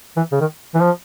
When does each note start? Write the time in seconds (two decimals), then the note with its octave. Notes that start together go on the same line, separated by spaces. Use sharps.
0.17 E3
0.32 C#3
0.40 D#3
0.74 E3
0.81 F3